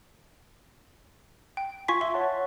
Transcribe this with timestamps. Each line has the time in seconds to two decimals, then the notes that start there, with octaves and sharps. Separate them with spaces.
1.57 G5
1.88 F4 G#5 C6 C#6 B6
2.01 E5 C6
2.14 C#5 F#5 A5